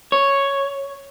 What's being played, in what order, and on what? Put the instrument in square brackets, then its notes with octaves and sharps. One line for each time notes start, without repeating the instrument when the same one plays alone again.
[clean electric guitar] C#5